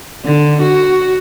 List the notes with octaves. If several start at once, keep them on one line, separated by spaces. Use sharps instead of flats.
D3
F#4